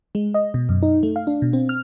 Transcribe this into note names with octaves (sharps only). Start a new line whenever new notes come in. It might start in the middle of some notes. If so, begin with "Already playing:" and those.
G#3
D#5
B2
F#2
D#4
A3
F5
D4
B2
C4
F6